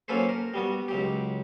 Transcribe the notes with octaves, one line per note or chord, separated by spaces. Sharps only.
F#3 A#3 C#4 A4 B4 C5
A#4
G3 B3 F#4
C#2 F#3 G4